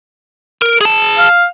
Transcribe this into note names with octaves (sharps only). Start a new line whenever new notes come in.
A#4
G#4 A5
F5